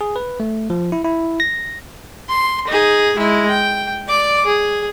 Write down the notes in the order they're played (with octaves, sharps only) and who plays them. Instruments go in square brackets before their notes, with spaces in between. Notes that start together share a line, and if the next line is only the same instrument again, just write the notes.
[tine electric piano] G#4
B4
A3
F3
E4
E4
A#6
[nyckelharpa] C6
D#4 G#4
G#3 E4
G5
D5 D6
G#4